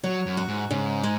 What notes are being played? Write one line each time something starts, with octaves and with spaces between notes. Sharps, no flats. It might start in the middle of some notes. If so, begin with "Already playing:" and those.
F#3 C#5
F#2
F#4
G#2
G#2 C#3
G#3